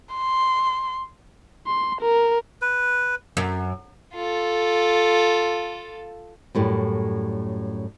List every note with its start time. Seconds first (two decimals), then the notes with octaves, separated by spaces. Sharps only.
0.15 C6
1.66 C6
2.01 A#4
2.62 B4
3.37 F#2
4.14 F4 A4
6.55 F#2 A2 G3